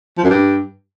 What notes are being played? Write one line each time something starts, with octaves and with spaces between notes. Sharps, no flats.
F3
F#2
G2